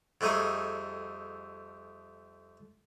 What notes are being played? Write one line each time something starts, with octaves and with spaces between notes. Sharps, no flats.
F2 G3 A3 D#4 G#4